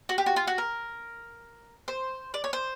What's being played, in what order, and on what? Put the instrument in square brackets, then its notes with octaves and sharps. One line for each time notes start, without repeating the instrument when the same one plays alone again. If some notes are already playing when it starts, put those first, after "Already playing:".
[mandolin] F#4
G4
F#4
F4
F#4
A#4
C5
D5
C#5
C5